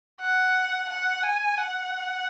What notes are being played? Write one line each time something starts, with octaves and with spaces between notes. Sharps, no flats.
F#5
F#5
G#5
F#5